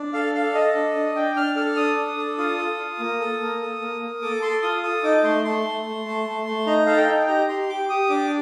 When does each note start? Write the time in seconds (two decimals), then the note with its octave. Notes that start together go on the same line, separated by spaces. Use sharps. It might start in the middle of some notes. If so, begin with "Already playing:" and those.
Already playing: D4
0.13 A4 F5
0.34 A4 F5
0.54 A4 D#5
0.75 D4
0.96 D4
1.15 D4 G5
1.36 D4 F6
1.56 A4 F6
1.76 D4 D#6
1.97 D4
2.17 A4
2.38 F4 D#6
2.58 A4
2.78 F4
2.99 A#3
3.20 A4
3.40 A#3
3.61 A4
3.81 A#3
4.02 A#3
4.22 A4 D6
4.42 A4 C6
4.62 F4 D#6
4.83 A4 D#6
5.03 D#4 D6
5.23 A3 C6
5.45 A3 C6
5.65 A3
5.85 A3
6.05 A3
6.26 A3
6.46 A3
6.67 D#4 A#5
6.86 A4 F5
6.97 G5
7.08 D#4
7.28 G4 A#5
7.49 G4 C6
7.69 G4 D6
7.89 G4 D#6
8.10 D4 D6